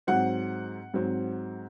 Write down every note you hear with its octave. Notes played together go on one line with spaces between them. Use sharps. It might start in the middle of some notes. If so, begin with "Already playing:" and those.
G#2 F#3 C4 F#5
G#2 F#3 C4